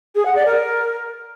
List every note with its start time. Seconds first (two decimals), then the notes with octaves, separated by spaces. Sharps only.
0.15 G#4
0.25 F#5
0.35 D5
0.45 A#4